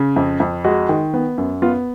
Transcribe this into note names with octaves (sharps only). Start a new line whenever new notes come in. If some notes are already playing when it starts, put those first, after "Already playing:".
Already playing: C#3
F2
F2
G#3 F#4
D#3
B3
F#2
B3 F4